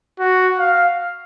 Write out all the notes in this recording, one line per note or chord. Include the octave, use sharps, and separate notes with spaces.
F#4
F5